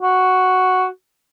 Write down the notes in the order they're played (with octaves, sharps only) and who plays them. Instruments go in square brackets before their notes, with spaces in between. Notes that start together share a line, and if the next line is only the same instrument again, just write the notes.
[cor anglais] F#4